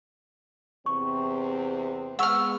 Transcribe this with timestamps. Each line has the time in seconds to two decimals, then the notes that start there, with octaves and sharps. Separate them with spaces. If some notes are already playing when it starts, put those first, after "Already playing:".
0.86 E2 C3 C4 C#6
2.19 G#3 B3 F#5 C#6 E6 F6